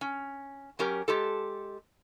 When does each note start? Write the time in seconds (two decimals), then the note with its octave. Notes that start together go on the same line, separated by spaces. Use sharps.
0.01 C#4
0.79 F#3 C#4 G4 A#4
1.08 G#3 G4 A4